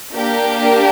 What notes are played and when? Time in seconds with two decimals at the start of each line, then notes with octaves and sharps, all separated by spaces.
0.14 A#3 D4 G4 A#4
0.61 A#4